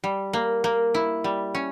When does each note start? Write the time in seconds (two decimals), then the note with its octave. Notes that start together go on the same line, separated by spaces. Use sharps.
0.04 G3
0.33 A#3
0.64 A#3
0.94 E4
1.24 G3
1.55 C#4